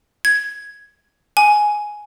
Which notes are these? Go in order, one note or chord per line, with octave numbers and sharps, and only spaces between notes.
G#6
G#5